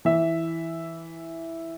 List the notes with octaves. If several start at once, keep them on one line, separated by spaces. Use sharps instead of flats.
E3 E5